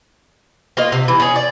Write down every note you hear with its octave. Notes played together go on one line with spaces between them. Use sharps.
A#3 F4 D#5
C3
E3
C#4 G#4
D5